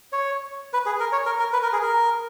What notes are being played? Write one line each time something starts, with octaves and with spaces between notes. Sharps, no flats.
C#5
B4
G#4
A#4
C#5
A#4
A#4
B4
A#4
G#4
A#4